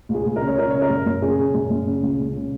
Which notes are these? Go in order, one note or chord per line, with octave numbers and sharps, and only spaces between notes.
C#2
G#4
C#2
A#4
C#3
C#5
C#3 A#4
C#3 C#5
A#4
F#2
F#2
C#3 G#4
C#3
F#2
F#2
C#3
C#2
C#3
C#3